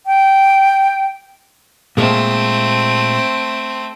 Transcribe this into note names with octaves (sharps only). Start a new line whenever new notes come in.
G5
A#2 G#3 A3 C4